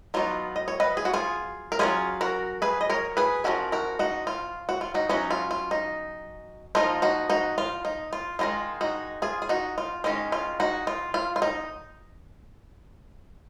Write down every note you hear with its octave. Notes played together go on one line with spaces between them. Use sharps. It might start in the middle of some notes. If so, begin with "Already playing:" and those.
F#3 B3 D#4 F4
D#5
C#5
B4 D#5
G#4
F#4
F4 G#4
A#4
F#3 A#3 C#4 F4 G#4
F#4 A#4
G#4 B4
D#5
A#4 C#5
G#4 B4
F3 A#3 C#4 F#4 A#4
F#4 A#4
D#4 F#4
F4
F#4
F4
D#4 F#4
F#3 C#4 D#4 F#4
F4
F4
D#4
F3 A#3 D#4 F4
D#4 F#4
D#4 F#4
F4
D#4
F4
D#3 G#3 D#4 F4
D#4 F#4
F4 G#4
G#4
D#4 F#4
F4
D#3 G#3 C#4 D#4
F4
D#4 F#4
F4
F4
F4
D#4